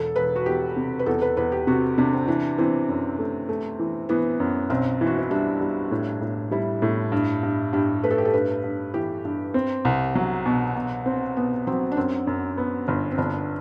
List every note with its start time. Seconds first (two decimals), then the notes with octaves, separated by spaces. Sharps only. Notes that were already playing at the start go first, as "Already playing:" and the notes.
Already playing: E1 A4
0.16 E1 B4
0.36 F#4
0.46 E2 G4
0.76 C3
0.99 B4
1.06 E2 A4
1.22 B4
1.37 E2 B4
1.52 G4
1.67 C3 F#4
1.98 C3 D4
2.13 C4
2.28 E3 D4
2.58 E3 C4
2.89 F#2
3.19 A3
3.49 A3
3.79 E3
4.09 E3 B3
4.40 F#2
4.70 B1 C4
5.01 E3
5.07 F#4
5.19 E4
5.31 G3 D4
5.61 G3
5.91 A2
6.21 A2
6.51 G3 E4
6.82 A2
7.12 G2
7.43 G2
7.73 G2 G4
8.04 A3 B4
8.11 A4
8.18 G4
8.25 A4
8.33 G2 B4
8.64 G2
8.94 E3 G4
9.25 G2
9.54 C4
9.85 C2
10.15 F#3
10.46 B2
10.75 B2
11.06 C4
11.37 B2 B3
11.67 F#3 C4
11.92 D4
11.97 F#2 C4
12.27 F#2
12.58 B3
12.88 G1
13.11 C4
13.18 G1 D4